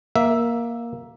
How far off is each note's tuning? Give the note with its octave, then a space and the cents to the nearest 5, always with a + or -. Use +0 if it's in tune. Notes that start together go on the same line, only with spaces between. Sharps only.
A#3 +10 E5 +0